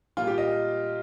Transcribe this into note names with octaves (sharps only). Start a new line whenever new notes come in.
A#2 G3 A#3 F4
G4
D#5